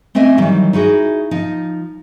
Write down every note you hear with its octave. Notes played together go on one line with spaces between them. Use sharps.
A3 C4 C#4 D#5 E5 G#5
D#3 E3 F#3 G3
D#4 E4 F#4 G#4
F3 D#4